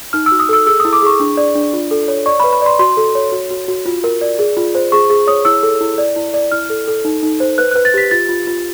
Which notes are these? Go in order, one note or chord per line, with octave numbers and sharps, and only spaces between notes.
D#4 F6
E6
F#4
D#6
A4 E6
G#4 E6
D#6
E4
D6
G#4 C#6
D4
D5
D4
F4
A4
C#5
D5 C#6
B5
B4
B5
D5 C6
F#4 C6
A4
C#5
F#4
F#4
F#4
F4
A#4
D5
G#4
F4
C5
G#4 C#6
G#4
C#5 D#6
E4 E6
A4
E4
D5
E4
D5
E4 F6
A4
A4
D#4
D#4
C5
B4 F#6
F#6
B4
A6
G4 B6
F4 A6
F4
F4